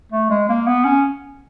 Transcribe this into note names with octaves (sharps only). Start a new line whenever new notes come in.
A3
G#3
A#3
B3
C#4